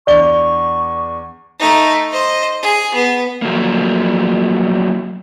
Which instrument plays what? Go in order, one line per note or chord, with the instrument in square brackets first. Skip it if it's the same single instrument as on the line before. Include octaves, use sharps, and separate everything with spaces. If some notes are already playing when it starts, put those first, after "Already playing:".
[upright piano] E2 D4 G7 [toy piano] D5 [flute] C#6
[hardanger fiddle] A3 D#4
C5 D#5
G#4
B3
[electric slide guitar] F3 F#3 A3 A#3